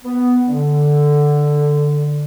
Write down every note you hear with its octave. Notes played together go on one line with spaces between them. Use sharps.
B3
D3